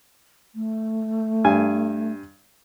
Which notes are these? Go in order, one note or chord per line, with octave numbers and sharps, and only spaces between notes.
A3
G2 G#5